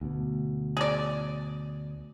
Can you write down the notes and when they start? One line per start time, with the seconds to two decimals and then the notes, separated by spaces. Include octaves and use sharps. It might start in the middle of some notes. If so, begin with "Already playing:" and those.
0.01 D2 B2
0.77 G#4 D5